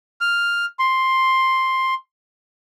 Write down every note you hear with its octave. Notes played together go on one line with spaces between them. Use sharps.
F6
C6